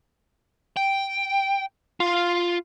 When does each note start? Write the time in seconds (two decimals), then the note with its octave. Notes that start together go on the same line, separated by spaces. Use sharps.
0.77 G5
2.00 F4